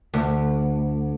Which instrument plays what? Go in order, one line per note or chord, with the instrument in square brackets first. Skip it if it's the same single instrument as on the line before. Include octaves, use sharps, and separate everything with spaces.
[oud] D2